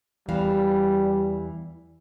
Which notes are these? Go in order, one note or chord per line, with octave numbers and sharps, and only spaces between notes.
E2 E3 G3 F5